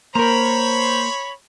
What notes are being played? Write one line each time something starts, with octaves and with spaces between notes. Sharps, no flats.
A#3 A#4 C5 C#5 A#5 B5